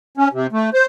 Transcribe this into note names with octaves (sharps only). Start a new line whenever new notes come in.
C#4
C3
A3
C5